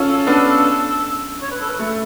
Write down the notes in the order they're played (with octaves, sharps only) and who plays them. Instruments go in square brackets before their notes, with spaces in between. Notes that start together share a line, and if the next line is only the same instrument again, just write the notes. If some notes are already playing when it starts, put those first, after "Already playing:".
Already playing: [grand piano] C#4 F4 [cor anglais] A4
[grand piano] B3 D4
[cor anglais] C#5
B4
A4
B4
[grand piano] A3